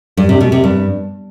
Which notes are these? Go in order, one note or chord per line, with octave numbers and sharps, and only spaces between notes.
G2
C3
B2
C3
G2